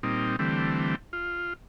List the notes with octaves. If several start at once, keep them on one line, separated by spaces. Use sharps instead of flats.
A#2 G3 C4 D#4
D3 E3 G3 A3 C4
F4